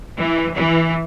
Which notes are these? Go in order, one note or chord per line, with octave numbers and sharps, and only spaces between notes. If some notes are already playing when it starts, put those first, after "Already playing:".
E3
E3